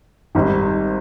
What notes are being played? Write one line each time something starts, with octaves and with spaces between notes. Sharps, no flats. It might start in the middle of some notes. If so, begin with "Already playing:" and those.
G#1 G#2 G3